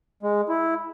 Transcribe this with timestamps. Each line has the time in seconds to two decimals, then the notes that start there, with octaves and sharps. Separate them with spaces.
0.23 G#3
0.49 E4